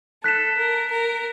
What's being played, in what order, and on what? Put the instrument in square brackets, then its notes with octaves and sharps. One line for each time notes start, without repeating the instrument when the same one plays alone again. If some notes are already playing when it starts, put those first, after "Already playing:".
[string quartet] A4 [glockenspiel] F#6 B6 E7
[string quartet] A#4
A#4